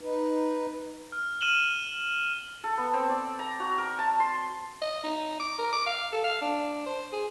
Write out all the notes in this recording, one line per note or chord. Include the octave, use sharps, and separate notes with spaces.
D#4 B4
F6
F6 D#7 E7 F#7 G7
A4
B3
C4
D5
A#5
F#4
A#4
A5
C6
D#5
D#4
D6
A#4
D6
F5
A4
F5
D4
C5
G#4